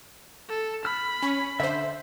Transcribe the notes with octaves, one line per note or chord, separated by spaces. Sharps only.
A4
B5 F6
C#4
D3 C5 E5